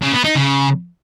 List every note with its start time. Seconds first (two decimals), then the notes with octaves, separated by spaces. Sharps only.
0.02 C#3
0.13 B3
0.24 D#4
0.35 C#3